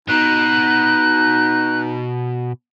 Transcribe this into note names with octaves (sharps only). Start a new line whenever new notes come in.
B2 D#4 F#6